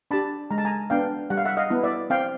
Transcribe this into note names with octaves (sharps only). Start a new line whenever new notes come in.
D4 G4 A5 B5
G#3 A#5
A5
G#5 A#5
B3 D4 F5 G5
G3 F#5
F5
E5 F#5
D#5 F5
B3 E4
D5 E5
C4 F5 G5